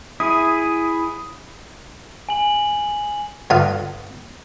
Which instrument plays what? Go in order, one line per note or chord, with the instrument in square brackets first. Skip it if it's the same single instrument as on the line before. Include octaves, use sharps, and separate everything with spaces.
[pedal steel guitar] E4 G#4 [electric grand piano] D#6
[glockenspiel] G#5 F#7
[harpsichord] G2 D3 F4 C6 D#6